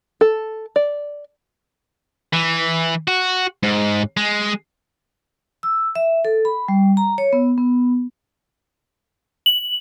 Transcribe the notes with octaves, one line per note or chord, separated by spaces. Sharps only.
A4
D5
E3
F#4
G#2
G#3
E6
E5
A4
B5
G3
A#5
C#5
B3
B3
F#7